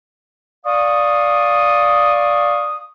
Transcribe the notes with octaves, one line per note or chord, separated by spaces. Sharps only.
D5 F5 C#6 D#6